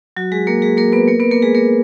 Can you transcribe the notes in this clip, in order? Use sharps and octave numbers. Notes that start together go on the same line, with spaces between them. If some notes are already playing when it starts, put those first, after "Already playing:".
F#3 F#4
G#3 G#4
A#3 A#4
G#3 G#4
A#3 A#4
B3 B4
A#3 A#4
B3 B4
A#3 A#4
G#3 G#4
A#3 A#4